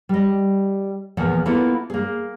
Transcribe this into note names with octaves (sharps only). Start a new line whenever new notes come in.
G3 D#5
E2 A#2 F3 A#3 F#5
A#3 B3 E4 F4 A4 A#4
A#3 G#4